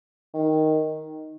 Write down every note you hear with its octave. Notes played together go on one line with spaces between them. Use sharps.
D#3